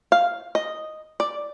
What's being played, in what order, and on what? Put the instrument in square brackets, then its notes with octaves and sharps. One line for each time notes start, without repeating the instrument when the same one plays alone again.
[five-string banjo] F5
D#5
D5